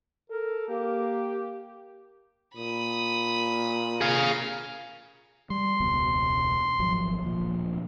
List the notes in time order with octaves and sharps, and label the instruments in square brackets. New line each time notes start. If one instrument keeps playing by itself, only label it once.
[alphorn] A4 [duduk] A#4
[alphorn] A#3 [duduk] G4
[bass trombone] A#2 [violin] B5 D#6
[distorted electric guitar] G#4 F5 [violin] A#5 F6
[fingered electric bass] G3 [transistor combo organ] C6
[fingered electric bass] E1 C#2 B2
G#1 F3 F#3
D1 A#2 F3